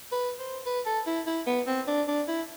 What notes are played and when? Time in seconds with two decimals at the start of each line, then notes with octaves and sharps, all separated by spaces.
0.12 B4
0.39 C5
0.66 B4
0.86 A4
1.07 E4
1.27 E4
1.47 B3
1.67 C4
1.88 D4
2.08 D4
2.28 E4